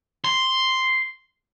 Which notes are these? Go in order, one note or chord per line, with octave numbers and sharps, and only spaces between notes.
C6